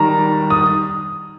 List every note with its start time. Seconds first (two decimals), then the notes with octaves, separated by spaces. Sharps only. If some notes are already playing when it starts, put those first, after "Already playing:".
Already playing: D#3 G3 D4 A5 A#5
0.50 D#6